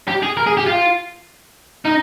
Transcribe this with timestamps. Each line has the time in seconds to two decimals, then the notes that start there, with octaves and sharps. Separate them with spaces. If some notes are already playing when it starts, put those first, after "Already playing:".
0.08 G4
0.23 G#4
0.37 A#4
0.47 G#4
0.57 G4
0.67 F4
1.85 D#4